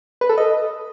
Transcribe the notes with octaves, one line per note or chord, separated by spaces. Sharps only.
B4
A4
D#5